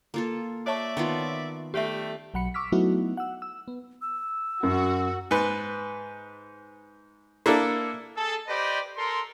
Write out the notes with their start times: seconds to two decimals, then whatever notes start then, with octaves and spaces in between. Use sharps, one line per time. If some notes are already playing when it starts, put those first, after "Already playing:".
0.14 A#3 F4 A4
0.67 C#5 D5 E5 A5 C#6
0.97 D#3 B3 F4
1.74 G3 A3 G4 E5
2.34 B1 F#3 F#5 B5 C#7
2.54 C#6 D6 E6 F6 B6
2.72 F#3 A3 B3 D#4 E4 F#4
3.17 F#5 E6
3.42 E6
3.68 B3
4.02 E6
4.63 F#2 F#4
5.31 G#2 B4
7.46 A#3 D4 E4 A4
8.17 G#4 A4
8.48 G4 B4 C5 D5 D#5
8.97 A4 A#4 C6